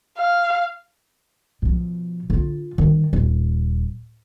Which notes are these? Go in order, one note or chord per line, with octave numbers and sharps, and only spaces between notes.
F5
B2 F3
D3 F4
D#3 G3
D#1